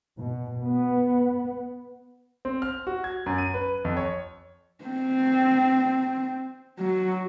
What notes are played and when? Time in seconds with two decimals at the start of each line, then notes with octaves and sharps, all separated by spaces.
0.18 B2
0.65 B3
2.45 C4
2.62 F6
2.87 F#4
3.04 G#6
3.26 F#2
3.38 D#7
3.54 B4
3.85 F2
3.97 C#5
4.84 C4
6.80 F#3